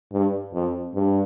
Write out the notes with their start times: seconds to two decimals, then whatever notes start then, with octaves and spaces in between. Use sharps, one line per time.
0.12 G2
0.54 F2
0.94 G2